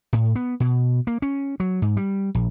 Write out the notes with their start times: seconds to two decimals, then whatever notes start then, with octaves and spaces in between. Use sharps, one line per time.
0.13 A2
0.36 B3
0.60 B2
1.07 A#3
1.22 C#4
1.60 F#3
1.82 G#2
1.97 G3
2.35 A#1